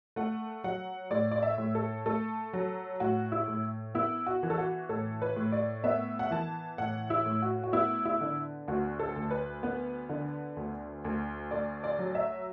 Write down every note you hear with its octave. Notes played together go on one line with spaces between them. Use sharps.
A3 F#5
F#3 F#5
A2 D5
D5
E5
A2
A4
A3 A4
F#3
A2 F#4
E4
A2
B3 E4
F#4
E3
A4
F#4
A2 A4
B4
A2
D5
B3 E5
F#5
E3 A5
A2 F#5
E4
A2
F#4
F#4
B3 E4
E4
D3
D2 F#4
A4
D2
B4
B3
D3
D2
D2
A3 D5
D5
F#3
E5